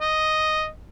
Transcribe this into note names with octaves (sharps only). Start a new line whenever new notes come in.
D#5